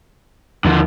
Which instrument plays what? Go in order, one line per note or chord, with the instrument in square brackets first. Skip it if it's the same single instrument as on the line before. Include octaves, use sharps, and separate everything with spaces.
[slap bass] D#2 [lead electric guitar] D3 F3